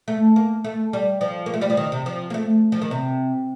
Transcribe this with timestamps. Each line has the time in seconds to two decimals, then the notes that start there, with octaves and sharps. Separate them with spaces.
0.08 A3
0.36 A#3
0.64 A3
0.93 G3
1.21 F3
1.46 A#3
1.54 A3
1.61 G3
1.70 F3
1.77 D#3
1.92 C3
2.06 F3
2.30 A#3
2.34 A3
2.72 F3
2.82 D#3
2.91 C3